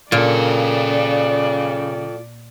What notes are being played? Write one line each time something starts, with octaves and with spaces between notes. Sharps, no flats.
A#2 C#3 F4 A4 D5